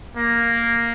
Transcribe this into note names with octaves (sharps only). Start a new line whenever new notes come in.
A#3